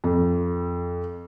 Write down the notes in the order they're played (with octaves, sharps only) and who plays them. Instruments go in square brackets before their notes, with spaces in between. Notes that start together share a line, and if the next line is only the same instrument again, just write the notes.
[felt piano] F2